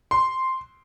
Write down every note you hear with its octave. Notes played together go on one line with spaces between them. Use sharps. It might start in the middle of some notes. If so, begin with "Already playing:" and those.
C6